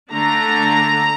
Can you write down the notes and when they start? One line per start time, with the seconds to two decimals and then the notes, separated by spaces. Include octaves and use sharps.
0.11 D3 A3 D4 A#5